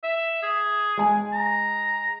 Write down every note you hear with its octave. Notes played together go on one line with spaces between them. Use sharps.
E5
G#4
G#3 G#5
A#5